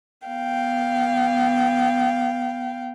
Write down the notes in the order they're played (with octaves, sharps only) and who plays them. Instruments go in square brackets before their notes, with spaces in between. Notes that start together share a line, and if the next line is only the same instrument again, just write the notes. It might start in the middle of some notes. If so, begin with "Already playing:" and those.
[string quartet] B3 F5 G5